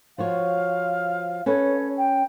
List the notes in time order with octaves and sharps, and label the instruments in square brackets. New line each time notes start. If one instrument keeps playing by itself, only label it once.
[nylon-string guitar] F3 F#4 C#5 [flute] F5
[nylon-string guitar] C#4 A4 B4 [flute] C#5
[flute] G5